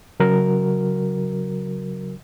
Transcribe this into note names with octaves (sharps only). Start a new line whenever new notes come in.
C#3 F#3 F#4 A#4